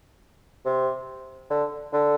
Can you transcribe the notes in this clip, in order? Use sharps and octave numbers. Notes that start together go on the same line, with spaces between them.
C3
D3
D3